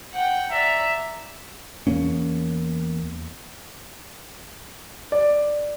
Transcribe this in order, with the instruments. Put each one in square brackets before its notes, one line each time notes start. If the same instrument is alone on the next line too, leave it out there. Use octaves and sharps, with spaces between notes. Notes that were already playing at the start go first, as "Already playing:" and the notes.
[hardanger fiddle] F#5 G5
[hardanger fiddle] D5 A#5 [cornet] E5
[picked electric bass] E2 A#3 C#4
[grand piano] D5